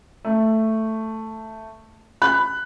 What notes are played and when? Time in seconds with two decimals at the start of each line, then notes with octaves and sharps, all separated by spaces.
0.25 A3
2.22 B5 F#6